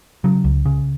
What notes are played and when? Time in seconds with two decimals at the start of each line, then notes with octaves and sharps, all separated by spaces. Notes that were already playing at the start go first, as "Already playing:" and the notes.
0.24 C#3 F#3
0.44 C#2
0.65 C#3